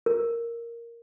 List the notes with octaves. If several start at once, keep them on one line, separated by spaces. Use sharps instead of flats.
A#4